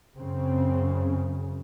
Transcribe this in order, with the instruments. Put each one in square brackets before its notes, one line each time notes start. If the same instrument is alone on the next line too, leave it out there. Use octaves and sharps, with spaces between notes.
[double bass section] F#2 C#3 C4